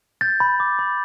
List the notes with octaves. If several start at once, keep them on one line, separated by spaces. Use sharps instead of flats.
G6 A6
B5
D6
B5